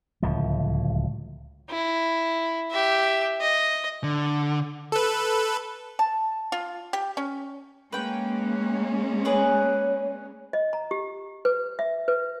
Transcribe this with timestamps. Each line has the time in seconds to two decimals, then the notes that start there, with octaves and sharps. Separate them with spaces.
0.23 D1 C#2 F3
1.70 E4
2.72 G4 E5
3.41 D#5
4.04 D3
4.92 A4 B4
5.99 A5
6.52 F4
6.93 G4
7.17 C#4
7.92 G#3 A#3 C#4 B4 G5
9.25 G#4 B4 C#5 D5
10.53 D#5
10.73 A#5
10.91 G4
11.45 B4
11.79 E5
12.08 B4